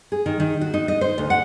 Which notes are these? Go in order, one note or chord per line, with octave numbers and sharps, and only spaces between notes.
G#4
D#3
D#3
F#4
D#4
D#5
C5
D2
F#5